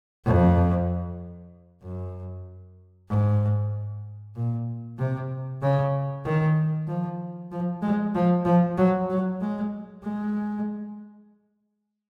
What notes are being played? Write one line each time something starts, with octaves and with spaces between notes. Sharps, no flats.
F2
F#2
G#2
A#2
C3
C#3
D#3
F3
F3
G#3
F3
F3
F#3
F#3
G#3
G#3